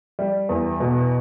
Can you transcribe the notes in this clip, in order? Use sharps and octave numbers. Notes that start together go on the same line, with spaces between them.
G3
E2
B2